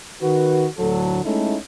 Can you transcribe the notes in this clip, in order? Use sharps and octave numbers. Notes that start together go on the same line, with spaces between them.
D#3 F#4 B4
D2 A2 D3 F#3 A4
G#3 A3 C#4 D#4 E4 A4